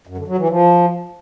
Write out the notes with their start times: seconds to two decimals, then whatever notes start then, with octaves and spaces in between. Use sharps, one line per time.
0.07 F#2
0.18 D3
0.28 F#3
0.38 E3
0.48 F3